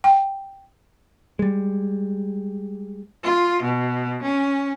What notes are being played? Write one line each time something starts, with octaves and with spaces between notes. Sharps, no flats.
G5
G3 G#3
F4
B2
C#4